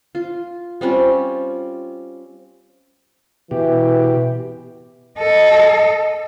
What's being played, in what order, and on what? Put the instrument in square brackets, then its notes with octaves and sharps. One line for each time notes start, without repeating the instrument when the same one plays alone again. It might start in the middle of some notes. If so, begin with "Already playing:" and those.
[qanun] F4
G3 C4 C#4 F4
[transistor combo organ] B2 G4 [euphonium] E3
[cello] A4 D#5